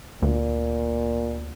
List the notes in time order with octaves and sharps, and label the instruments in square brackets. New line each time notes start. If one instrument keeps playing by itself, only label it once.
[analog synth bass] D2 [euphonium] A#2